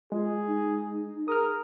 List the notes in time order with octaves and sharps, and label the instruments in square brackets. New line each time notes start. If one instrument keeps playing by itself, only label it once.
[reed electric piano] G#3 [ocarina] F4 [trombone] G#4
[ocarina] D#4
[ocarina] G#4 [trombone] A#4 [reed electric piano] D#6 F6